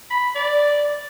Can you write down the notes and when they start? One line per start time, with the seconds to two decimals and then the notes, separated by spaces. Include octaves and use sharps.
0.11 B5
0.35 D5